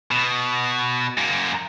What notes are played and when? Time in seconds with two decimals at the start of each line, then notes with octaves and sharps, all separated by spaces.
0.11 B2
1.18 F#2 A#3